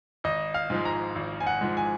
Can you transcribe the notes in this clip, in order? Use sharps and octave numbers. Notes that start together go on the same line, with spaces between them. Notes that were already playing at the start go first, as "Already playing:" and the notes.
G#1 D#5
F5
G#2 F3 G#3
A#5
G#1
G#5
F#5
G#2 F3 G#3
G#5